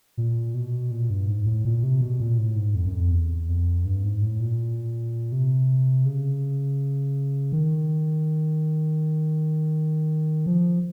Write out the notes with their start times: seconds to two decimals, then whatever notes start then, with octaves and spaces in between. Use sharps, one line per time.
0.17 A#2
0.54 B2
0.91 A#2
1.10 G2
1.28 G#2
1.46 A2
1.65 A#2
1.83 C3
2.01 B2
2.20 A#2
2.38 A2
2.56 G#2
2.75 F2
2.86 F#2
2.93 F2
3.12 E2
3.49 F2
3.85 G2
4.04 G#2
4.22 A2
4.40 A#2
5.32 C3
6.05 C#3
7.52 D#3
10.46 F3